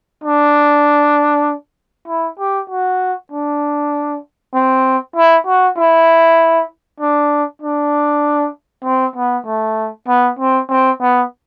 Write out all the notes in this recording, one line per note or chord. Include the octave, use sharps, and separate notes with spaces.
D4
E4
G4
F#4
D4
C4
E4
F#4
E4
D4
D4
C4
B3
A3
B3
C4
C4
B3